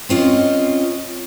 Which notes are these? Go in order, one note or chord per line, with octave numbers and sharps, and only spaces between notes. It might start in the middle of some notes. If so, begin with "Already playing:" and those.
C4 C#4 F4 D#5